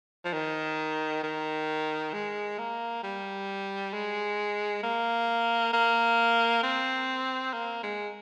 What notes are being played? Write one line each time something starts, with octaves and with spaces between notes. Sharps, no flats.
F3
D#3
D#3
G#3
A#3
G3
G#3
A#3
A#3
C4
A#3
G#3